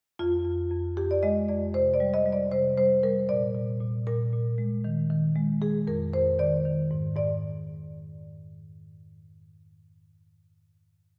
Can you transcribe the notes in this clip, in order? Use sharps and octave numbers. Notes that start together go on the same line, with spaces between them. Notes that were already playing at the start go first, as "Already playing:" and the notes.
F2 F4
F2
F2
F2 G4
D5
G#3 D#5
F2 D5
C3 C5
D5
G3
D#5
G3
D5
C3 C5
G3 C5
G3 A#4
A#2 D5
A#2
A#2
A#2 A#4
A#2
G#3
D#3
D#3
G#3
G#3 G#4
F2 A#4
F2 C5
D#3 D5
D#3
G#2
G#2 D5